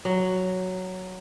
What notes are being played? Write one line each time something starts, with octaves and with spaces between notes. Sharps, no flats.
F#3